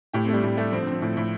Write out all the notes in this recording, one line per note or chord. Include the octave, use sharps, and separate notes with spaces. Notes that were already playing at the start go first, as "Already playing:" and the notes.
A2 G4
C4
G3 A3
A2
G3 A3
F3 C4
D3
C4
F3
A2
A2